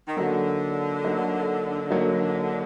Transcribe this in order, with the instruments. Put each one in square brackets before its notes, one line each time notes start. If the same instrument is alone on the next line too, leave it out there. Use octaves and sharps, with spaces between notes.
[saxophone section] D#3
[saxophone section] D3 [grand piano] F#3 A#3 D#4 F#4
[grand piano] F#3 A#3 D#4 F#4
F#3 A#3 D#4 F#4